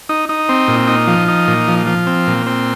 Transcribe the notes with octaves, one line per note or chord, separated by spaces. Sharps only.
D#4
D#4
C4
A#2
D#4
F3
D#4
A#2
F3
F3
C4
A#2
C4